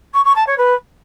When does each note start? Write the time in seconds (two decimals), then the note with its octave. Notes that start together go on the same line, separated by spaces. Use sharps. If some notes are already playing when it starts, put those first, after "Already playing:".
0.13 C#6
0.24 C#6
0.35 A5
0.47 C#5
0.58 B4